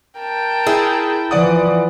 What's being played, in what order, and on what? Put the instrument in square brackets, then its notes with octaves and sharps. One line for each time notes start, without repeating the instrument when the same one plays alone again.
[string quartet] A#4 G5 A5
[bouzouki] E4 [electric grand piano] G#4
[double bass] E3 F3 [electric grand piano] D5 F#5 D#6